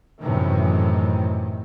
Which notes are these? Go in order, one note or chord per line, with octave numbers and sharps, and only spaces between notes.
F#2 A2 C3 D#3 E3